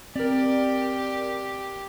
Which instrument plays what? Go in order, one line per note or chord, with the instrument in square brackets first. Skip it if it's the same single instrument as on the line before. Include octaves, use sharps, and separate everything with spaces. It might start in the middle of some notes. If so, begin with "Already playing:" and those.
[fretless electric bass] C4 [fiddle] G4 [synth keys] A#4 D5